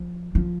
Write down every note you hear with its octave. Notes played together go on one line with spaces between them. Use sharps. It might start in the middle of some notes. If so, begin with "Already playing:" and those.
Already playing: F3
F3